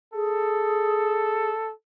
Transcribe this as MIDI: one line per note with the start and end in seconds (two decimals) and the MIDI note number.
0.13 1.51 68
0.13 1.72 69